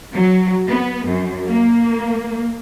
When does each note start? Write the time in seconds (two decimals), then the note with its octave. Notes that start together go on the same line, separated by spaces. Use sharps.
0.13 F#3
0.68 B3
1.07 F#2
1.48 A#3